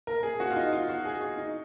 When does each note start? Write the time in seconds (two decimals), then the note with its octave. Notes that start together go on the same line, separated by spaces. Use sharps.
0.07 A#4
0.23 G#4
0.40 F#4
0.50 F4
0.56 D#4
0.73 F4
0.89 F#4
1.05 G#4
1.21 F#4
1.38 D#4